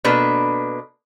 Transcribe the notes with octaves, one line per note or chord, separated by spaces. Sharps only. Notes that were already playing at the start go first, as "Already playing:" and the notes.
B2 A#3 D4 A4 B4